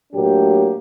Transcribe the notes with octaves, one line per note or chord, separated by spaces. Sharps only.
A2 F#3 A#3 D4 G4